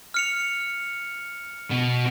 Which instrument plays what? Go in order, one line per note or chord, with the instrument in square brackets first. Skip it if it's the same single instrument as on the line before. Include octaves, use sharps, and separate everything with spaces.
[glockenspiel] F6 C#7 F7
[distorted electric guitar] B2